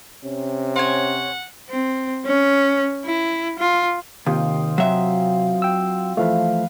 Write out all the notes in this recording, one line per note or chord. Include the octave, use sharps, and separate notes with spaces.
C3 C#4
C4 C#5 F#5 G#5
C4
C#4
E4
F4
D#2 C3 F4 G5 D#6
F#3 C4 C5 E5
G5 E6
E3 F3 A3 B4 F5